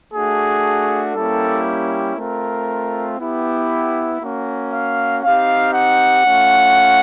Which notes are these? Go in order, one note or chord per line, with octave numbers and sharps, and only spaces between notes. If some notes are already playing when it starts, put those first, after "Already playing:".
A3 D4 F#4 G#4
G3 A#3 C#4 E4 G4 A4
A3 C4 F4 A#4
B3 E4 G4
A#3 C#4 F#4
F5
C4 D#4 G4 F5
F#5
A3 C#4 F4